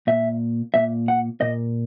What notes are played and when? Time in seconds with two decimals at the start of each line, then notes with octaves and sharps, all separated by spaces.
0.07 A#2 E5
0.74 A#2 E5
1.08 F#5
1.41 A#2 D#5